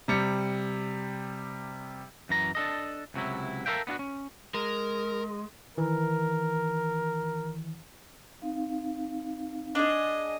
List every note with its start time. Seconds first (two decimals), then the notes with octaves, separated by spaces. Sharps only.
0.08 C3 G3 C#7
2.29 F#2 E3 A#5
2.55 D4 A4 D#5
3.14 C#2 C3 F#3 E4
3.66 A4 A#4 C5 E5 F5 G5
3.87 B3 D4 F4 F#4
3.99 C#4
4.54 G#3 A#4
5.78 D#3 E3 A#4
8.42 C4 D#4 F5
9.75 D4 G#4 D#5